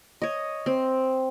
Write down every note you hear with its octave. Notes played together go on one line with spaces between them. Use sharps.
C#5 D#5
C4